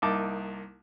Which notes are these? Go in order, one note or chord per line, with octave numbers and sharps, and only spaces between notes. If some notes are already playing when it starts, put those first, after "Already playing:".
C2 A#3 D#4 A5 D6